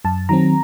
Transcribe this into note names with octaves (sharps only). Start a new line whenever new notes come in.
F#2 A5
D#3 F#3 C4 A#5